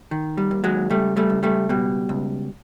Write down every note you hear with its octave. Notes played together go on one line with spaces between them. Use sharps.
D#3
G3
D#2
F#3 G#3
C#2 G3 A3
G3 A3
C#2
G3 A3
B2 G3
C#2